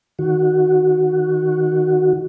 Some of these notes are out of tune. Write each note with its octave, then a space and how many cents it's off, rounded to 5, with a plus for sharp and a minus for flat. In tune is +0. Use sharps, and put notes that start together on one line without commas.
D#3 +0 F#4 +0